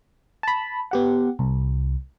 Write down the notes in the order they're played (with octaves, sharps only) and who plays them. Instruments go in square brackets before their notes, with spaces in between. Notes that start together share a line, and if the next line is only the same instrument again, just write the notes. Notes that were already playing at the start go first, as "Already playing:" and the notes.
[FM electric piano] A5 B5
B3 G4 F#5
C2